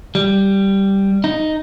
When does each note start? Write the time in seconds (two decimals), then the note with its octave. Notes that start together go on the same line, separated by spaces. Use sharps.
0.15 G3
1.24 D#4